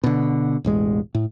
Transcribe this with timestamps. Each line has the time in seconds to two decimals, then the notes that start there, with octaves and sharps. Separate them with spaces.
0.04 B2 D3
0.64 E1 A1 G#3
1.15 A2